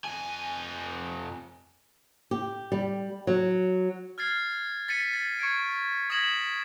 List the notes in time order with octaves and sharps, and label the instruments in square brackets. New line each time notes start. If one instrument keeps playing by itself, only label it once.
[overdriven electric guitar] F2 G#5
[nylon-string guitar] G4
G3
F#3
[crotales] F6 G#6 A6 C7
A6 B6 C#7 D#7
A6
C#6 G#6 C#7 D7
D#6 G#6 A#6 B6 E7 F#7